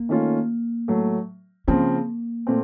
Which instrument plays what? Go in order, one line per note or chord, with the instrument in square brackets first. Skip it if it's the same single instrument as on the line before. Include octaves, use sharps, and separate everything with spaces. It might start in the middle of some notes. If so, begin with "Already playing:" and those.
Already playing: [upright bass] A#3
[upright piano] D#3 A3 C#4 F4
A2 F#3 A3
[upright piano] C#3 F3 C4 [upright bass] A#3
[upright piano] A#2 A3 C4